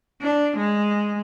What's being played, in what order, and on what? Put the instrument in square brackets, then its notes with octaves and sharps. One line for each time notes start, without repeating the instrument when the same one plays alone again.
[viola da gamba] D4
G#3